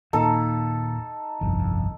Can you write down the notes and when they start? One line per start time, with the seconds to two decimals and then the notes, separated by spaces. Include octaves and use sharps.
0.13 D#2 A#2 D#4 A4
1.41 G1 C2 F2